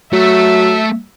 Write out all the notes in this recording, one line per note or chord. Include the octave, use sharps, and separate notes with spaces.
F#3 A3 E5